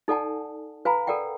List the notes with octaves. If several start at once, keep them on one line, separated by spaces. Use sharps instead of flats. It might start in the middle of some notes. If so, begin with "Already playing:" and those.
D#4 A4 D5 F#5 G#5 A5
B4 F5 G#5 A#5 B5
A4 A#4 D5 F#5 G5